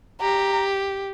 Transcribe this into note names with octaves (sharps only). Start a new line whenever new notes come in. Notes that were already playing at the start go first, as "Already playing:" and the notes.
G4 A#5